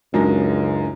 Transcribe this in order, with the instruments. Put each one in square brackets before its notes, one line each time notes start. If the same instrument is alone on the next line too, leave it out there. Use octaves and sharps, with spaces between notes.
[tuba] C#2 [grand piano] F#2 G#3 [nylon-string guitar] D4 D#4 A#4